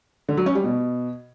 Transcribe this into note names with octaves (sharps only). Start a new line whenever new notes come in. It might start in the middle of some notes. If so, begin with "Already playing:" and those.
D3
F#3
C#4
G3
B2